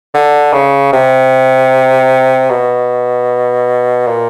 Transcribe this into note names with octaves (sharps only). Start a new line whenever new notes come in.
D3
C#3
C3
B2
A#2